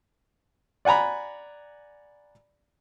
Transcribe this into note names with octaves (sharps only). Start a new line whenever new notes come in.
D5 F#5 G#5 A#5 B5